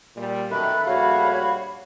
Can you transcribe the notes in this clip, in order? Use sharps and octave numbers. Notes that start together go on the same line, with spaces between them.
A#2 G3
F#2 B2 D#3 A3 B5 F#6
A#1 G3 F#4 C#5 F5 B5